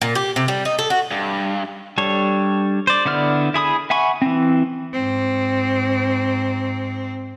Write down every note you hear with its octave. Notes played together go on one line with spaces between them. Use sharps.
A#2
G4
C3
G3
D#4
A4
F#4
G2
G3 D4 A4 C#5
C5 D5
D3 B3 E4 D5 F6
E4 G#4 B5 D#6
E5 F#5 G#5 B5 C#6
E3 C4
G#2 C4